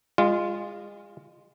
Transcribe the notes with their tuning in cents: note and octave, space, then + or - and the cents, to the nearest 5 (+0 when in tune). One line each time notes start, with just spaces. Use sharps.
G#3 -30 F4 +0